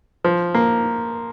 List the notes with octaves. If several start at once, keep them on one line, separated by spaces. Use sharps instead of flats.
F3
A#3